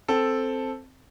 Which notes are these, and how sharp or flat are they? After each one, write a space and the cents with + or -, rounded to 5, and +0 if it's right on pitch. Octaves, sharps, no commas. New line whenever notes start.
C4 +0 A4 +0